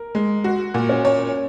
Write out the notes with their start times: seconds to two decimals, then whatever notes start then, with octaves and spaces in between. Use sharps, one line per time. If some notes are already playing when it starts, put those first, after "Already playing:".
Already playing: A#4
0.15 G#3
0.44 F#4
0.74 A#2
0.89 C#4
1.05 C#5